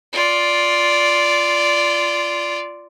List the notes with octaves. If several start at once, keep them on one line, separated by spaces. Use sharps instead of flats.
F4 D5